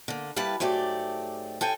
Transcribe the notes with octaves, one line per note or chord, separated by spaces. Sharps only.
D3 A#3
G3 A#3 E4 G4 B4 A5
G#2 F#3 A3 G4 D5
A2 A4 G5 G#5